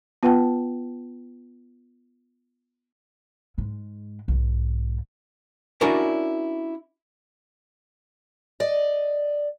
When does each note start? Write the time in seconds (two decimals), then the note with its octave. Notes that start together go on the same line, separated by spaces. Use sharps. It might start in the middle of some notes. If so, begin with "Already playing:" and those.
0.23 B3 F4 B4 F#5 G5 A5
3.58 G#2 G#3
4.28 B1 G#2
5.81 C#4 D4 E4 F#4 A#4 D5
8.60 D5 D#5